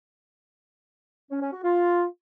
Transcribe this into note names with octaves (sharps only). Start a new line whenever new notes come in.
C#4
C#4
F#4
F4